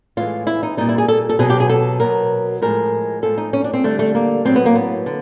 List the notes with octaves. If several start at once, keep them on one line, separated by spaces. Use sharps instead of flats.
A2 E3 G#3 F4
E4
D#4
A#2 G3 D#4
E4
G#4
A4
A4
B2 F#3 G#4
G4
G#4
A4
B2 F#3 A#4
A2 F3 G#3 A#4
A2 F3 G#3 A4
D#4
C#4
D4
C4
D3 G3 A3
A3
A#3
A2 F#3 C4
B3
A#3
B3
D3